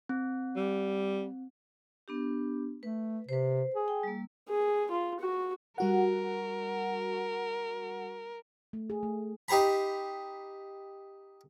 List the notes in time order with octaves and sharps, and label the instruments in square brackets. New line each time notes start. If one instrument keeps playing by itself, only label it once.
[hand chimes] C4
[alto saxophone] G3
[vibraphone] B3 D4 G4
[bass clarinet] A3 [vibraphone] B4
[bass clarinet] C3 [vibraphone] B4 C5
[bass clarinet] G#4
[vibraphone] G5
G3 A#3
[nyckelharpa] G#4
F4
F#4
[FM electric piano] G3 F#4 F#5 [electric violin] A#4
[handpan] A3
G#4
A3
[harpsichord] D#4 G4 C5 A#5 B5